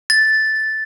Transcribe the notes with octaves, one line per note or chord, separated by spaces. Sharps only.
A6